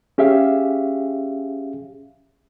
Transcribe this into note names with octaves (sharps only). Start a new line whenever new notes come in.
C#4 G4 G#4 E5 F5